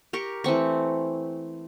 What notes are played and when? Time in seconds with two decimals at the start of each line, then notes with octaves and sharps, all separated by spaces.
0.13 G4 A#4 C#6
0.44 E3 A3 C4 C#6